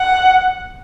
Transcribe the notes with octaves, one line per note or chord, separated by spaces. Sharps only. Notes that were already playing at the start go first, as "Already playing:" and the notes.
Already playing: F#5